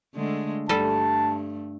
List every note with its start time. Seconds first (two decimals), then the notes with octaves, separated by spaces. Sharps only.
0.15 D3 G#3 A3
0.69 G2 G3 A3 A4 A5